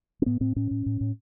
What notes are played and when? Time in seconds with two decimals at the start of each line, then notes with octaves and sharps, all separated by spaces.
0.22 C4
0.26 A2 B3
0.40 A2 C4
0.56 A2 C#4
0.71 A2
0.86 A2
1.01 A2